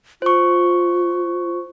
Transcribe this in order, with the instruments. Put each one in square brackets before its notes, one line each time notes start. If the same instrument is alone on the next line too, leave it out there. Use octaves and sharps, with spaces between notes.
[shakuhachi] F4 [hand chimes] C5 C#6